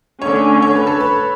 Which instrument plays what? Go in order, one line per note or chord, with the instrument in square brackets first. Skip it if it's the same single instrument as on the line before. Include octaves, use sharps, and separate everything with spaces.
[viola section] D3 A3 C#4 [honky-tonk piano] C#5
[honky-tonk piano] C#5
B4
A4
B4